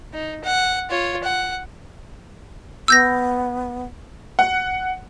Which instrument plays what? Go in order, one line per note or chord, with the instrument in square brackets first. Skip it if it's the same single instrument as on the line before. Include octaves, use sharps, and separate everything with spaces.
[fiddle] D#4
F#5
F4 C#5
F#5
[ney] B3 [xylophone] E6 G6 A#6
[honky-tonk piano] F#5